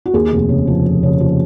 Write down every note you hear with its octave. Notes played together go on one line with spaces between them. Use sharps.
F#4
D#2 G#4
F1
C#3
F3
F3
C#3
F3